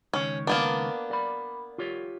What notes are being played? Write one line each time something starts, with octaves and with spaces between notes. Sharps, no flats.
C#2 D#3 C#4 C#5
A#3 B3 D4
D5 B5
F4 G4 C#5